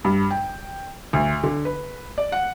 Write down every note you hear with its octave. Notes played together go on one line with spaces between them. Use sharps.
G2
G5
D2
D3
B4
D5
F#5